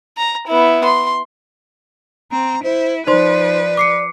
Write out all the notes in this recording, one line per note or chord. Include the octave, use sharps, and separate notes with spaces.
A#5
B3 E4
C6
C4 A#5
E4 C5
F3 D#4 B4 C5 D5 C6
D6 C7 C#7